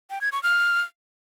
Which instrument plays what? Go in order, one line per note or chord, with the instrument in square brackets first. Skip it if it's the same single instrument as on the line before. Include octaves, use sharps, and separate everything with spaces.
[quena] G5
G#6
C#6
F6